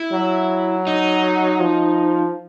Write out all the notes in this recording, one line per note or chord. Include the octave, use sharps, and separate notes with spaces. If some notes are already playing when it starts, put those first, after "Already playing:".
Already playing: E4
F#3
D#4
F3